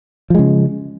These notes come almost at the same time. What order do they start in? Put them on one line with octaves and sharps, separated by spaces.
F3 G#3 C#3